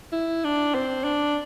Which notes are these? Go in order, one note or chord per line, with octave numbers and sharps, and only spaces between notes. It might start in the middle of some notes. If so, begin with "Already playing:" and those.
E4
D4
C4
D4